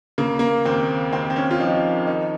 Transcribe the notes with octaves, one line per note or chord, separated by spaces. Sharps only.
C#3 A#3
A#3
D#2 C4
D#2 C4
C4
C#4
F4
F3 D#4
D#3 D#4